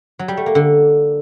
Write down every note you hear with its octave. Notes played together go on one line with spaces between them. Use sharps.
F#3
G3
A3
A#3
D3